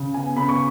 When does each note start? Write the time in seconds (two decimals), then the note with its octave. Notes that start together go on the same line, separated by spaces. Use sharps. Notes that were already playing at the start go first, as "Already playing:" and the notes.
Already playing: C#3
0.14 B3 G#5
0.37 C#3 B5
0.49 C#6